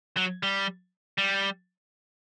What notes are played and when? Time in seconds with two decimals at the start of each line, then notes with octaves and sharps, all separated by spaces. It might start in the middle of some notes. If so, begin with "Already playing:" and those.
0.17 F#3
0.43 G3
1.18 G3